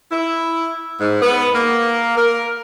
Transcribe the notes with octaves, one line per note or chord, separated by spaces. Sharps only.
E4
G#2
B3
A#3
A#4